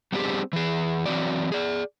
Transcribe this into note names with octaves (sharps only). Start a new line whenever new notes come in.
G3 B3 C4 D4 G4 G#4
E3 G#4
E3 F#3 C4 F#4 D5
G#4 D5